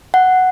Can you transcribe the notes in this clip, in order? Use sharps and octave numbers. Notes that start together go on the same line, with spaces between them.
F#5